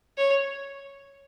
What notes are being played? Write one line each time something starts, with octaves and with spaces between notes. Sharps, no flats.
C#5